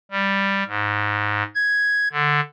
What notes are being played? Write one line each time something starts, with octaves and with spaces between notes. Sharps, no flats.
G3
G#2
G#6
D3